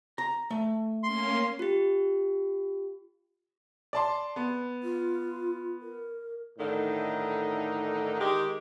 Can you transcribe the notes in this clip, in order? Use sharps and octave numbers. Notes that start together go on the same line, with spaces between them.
A#5
A3
A#3 C#4 C6
F4 G4
D5 A5 C6
B3
F4
A#4
A2 D3 D#3 D#4
D#3 G#3 G4